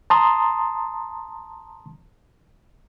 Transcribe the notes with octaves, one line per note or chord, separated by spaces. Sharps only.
A5 A#5 C6 D#6